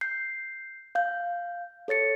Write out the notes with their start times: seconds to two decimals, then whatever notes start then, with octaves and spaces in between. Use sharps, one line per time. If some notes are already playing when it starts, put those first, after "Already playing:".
0.01 G6 C7
0.95 F5 G6
1.88 A4 C#5 A6 C#7